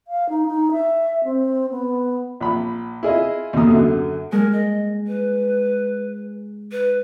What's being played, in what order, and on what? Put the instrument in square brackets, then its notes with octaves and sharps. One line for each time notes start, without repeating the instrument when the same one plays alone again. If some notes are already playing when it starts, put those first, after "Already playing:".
[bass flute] F5
D#4
D#4
E5
C4
B3
[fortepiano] A#1 B5
E4 F4 G#4 D#5
D#2 B2 D3 A#3 D#6
F#2 D3
[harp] G#3 [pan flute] A#4
[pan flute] D#5
B4
B4